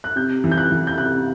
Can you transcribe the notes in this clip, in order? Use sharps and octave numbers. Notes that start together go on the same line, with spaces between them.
F#6
C3 G6
E3
G6
F#6
E3
G6
C3 F#6